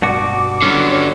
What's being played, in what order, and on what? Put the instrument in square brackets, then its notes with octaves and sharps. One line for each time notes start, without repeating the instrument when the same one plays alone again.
[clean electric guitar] G2 B2 F#4 [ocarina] D6
[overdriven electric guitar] D3 G3 [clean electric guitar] F#3 B3 C#4
[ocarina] C#5